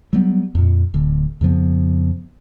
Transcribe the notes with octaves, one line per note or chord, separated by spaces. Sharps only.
F#3 G3 B3
F2 A#2
D1 D3
F2 C#3 F3 B3